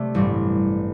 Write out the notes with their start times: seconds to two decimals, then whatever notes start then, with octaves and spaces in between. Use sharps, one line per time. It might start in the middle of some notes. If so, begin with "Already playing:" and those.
Already playing: C3 A3 D5
0.15 A1 G2 G3 C4